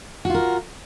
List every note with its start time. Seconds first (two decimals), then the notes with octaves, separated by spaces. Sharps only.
0.25 F#4
0.30 F4
0.34 A#4